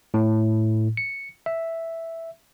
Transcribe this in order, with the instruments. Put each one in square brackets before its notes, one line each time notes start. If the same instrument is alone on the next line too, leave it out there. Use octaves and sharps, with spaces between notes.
[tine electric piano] A2
C#7
E5